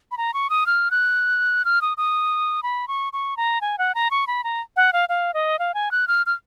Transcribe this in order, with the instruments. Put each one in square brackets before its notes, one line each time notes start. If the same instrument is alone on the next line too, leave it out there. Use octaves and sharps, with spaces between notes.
[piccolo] B5
A#5
C#6
D#6
F6
F#6
F6
D#6
D#6
B5
C#6
C#6
A#5
G#5
F#5
A#5
C#6
B5
A#5
F#5
F5
F5
D#5
F5
G#5
F#6
F6
F6